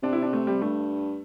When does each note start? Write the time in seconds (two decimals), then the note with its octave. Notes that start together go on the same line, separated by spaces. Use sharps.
0.03 C3 D4
0.13 E4
0.22 D4
0.33 A3
0.47 G3
0.62 G2 A3